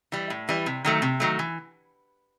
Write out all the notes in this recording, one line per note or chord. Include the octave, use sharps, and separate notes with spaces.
E3 G3
A2
E3 G3
C3
D#3 F#3 A3
C3
D#3 F#3 A3
E3